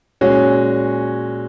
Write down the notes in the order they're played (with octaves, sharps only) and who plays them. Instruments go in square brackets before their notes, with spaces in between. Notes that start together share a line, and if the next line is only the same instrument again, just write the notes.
[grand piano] A#2 G#3 C#4 F#4 C#5